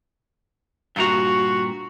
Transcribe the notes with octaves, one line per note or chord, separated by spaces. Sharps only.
G2 A#2 F#4 A#5